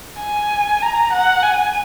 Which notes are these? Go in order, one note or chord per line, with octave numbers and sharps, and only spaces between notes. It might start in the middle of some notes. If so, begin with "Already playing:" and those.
G#5
A#5
F#5
G#5